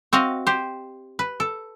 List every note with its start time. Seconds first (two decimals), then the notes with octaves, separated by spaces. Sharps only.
0.13 C4 F#4 D#5 F5
0.47 G4 C5
1.19 B4
1.40 A4